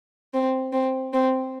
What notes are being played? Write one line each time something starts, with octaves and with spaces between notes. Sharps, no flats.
C4
C4
C4